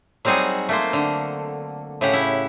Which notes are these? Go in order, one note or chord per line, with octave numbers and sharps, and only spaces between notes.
F#3 G3 C4 D#4 G#4 F#5
A3 A#3 C5
D3
A2 C#3 G4 F#5
E4